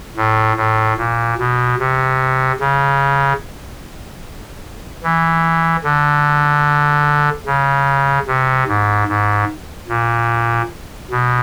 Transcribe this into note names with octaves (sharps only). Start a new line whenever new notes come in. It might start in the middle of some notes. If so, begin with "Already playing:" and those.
A2
A2
A#2
B2
C3
C#3
E3
D3
C#3
C3
G#2
G#2
A#2
B2